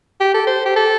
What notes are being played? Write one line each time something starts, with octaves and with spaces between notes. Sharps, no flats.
G4
A4
C5
G4
A4